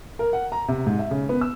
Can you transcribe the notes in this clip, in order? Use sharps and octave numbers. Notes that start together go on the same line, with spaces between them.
A#4
F#5
A#5
C3
G#2
E5
C#3
B3
E6